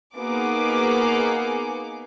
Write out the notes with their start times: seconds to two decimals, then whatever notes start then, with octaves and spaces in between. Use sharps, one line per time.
0.16 A#3 B3 D#4 F#4 G#4 D6